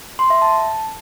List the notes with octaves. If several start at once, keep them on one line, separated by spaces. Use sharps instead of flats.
C6
E5
A5